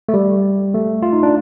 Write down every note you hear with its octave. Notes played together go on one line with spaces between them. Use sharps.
A3
G3
A3
F4
D#4
D4